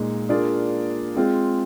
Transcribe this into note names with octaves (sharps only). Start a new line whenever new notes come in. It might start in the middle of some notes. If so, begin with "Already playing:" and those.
Already playing: A#2 G#3 D#4
A#3 D4 F4 G#4 D5
G#3 C4 F4 G#4